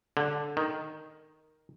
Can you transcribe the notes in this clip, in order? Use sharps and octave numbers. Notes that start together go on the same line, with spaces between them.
D3
D#3